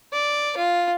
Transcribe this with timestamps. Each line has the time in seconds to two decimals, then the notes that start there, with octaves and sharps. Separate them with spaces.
0.13 D5
0.57 F4